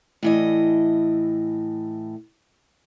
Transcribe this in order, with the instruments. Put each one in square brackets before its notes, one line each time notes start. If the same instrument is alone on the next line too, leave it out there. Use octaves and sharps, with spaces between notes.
[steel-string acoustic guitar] A2 E3 D#5